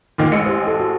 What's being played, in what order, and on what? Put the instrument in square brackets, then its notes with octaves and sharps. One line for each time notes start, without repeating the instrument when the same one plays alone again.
[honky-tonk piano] D2 A#2 D#3
A1 G#3 C#7
[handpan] G4 C5
A4
F#4